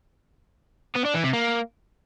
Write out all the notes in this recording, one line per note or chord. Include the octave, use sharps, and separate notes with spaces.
B3
D4
E3
C3
A#3